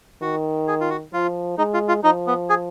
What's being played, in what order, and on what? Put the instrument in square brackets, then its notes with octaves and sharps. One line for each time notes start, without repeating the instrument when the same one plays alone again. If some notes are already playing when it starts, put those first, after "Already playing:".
[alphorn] D#3 [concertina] F#4
[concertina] G#4
F4
F#4
[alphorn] F3 [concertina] F4
[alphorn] G#3 [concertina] D#4
[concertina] F4
F4
[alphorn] F3 [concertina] D#4
[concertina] B3
G#4